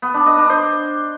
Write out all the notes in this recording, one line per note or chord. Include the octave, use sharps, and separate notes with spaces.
B3
D4
D#5
D4
C5